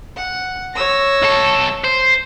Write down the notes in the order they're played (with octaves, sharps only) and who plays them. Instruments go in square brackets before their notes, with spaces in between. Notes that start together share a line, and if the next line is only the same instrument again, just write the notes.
[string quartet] F#5
C#5 E6 A#6
[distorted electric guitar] B1 A4
C5